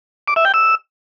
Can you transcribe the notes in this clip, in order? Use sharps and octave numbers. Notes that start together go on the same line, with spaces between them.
D6
E5
G5
E6